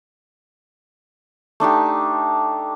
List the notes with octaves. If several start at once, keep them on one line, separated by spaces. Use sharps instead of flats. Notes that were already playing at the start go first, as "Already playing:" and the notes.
A3 D4 D#4 G4